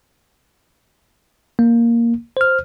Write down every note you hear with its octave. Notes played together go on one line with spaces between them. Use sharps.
A#3
C5 F6